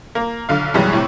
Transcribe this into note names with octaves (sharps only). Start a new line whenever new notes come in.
A#3
B1 D3 F5
F#2 B2 E3 G3 G#3
A2 C3